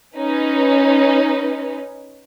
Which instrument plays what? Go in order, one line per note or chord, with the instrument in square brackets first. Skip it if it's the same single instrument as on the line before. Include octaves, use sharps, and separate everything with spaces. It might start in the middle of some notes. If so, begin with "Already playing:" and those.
[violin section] C#4 D#4 B4